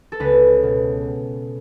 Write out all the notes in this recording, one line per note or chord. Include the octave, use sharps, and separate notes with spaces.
A4
C#2 B4
B2